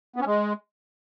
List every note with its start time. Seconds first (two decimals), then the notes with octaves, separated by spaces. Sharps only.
0.16 B3
0.21 C#4
0.26 G#3